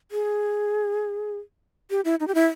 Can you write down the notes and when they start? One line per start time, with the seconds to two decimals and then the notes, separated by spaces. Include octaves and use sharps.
0.11 G#4
1.90 G4
2.05 E4
2.20 D#4
2.28 G4
2.35 E4